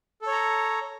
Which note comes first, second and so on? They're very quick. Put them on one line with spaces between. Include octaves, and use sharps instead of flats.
A4 C#5 A#5